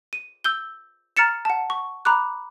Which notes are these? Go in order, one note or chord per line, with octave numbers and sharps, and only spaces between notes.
D#7
E6 G6 G7
A#5 F6 A6 C#7 E7
F#5 A5
C#6
A#5 B5 D6 F#6